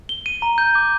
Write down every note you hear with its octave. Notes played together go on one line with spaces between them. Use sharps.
G7
D#7
A#5
G6
D6